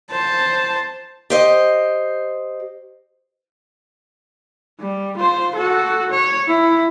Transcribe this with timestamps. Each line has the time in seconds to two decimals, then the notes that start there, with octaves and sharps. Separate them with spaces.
0.11 C5 A5
1.30 G4 C5 D#5
4.80 G3
5.18 F4 C5
5.55 F#4 A4
6.10 C#5
6.48 E4